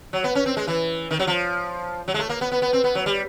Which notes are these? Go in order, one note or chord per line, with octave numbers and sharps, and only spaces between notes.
F#3
B3
C#4
C4
G#3
E3
D#3
F#3
F3
F#3
G#3
A3
A#3
B3
B3
B3
C4
B3
F#3
G3